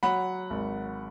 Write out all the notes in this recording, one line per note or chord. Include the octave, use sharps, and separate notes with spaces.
F#3 F#5 B5
G#1